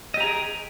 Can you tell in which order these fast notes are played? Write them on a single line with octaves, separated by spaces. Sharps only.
D#5 G4 A#5 G#4 G5